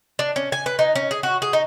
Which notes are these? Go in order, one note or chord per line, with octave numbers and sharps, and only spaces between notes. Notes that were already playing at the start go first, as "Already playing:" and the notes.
D4
C#4
G#5
B4
D#4
C#4
G#4
F#4
G#4
D#4